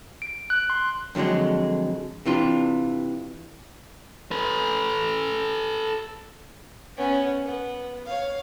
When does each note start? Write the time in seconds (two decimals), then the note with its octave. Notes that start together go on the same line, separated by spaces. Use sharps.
0.22 D7
0.50 F#6
0.70 C6
1.15 F2 D3 F3 F#3 G#3
2.26 C3 E3 D4 F4
4.31 A4 B4
6.97 B3 C#4
7.45 B3
8.06 C#5 F5